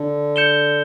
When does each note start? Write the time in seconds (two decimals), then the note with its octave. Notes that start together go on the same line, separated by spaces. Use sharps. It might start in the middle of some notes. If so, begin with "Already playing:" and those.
Already playing: D3
0.36 G6 C#7 E7 G7